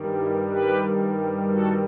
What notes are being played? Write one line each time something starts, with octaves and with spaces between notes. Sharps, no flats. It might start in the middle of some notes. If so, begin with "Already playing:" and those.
Already playing: G2 D#3 G3
E4 G4
G4 B4
F#4 A4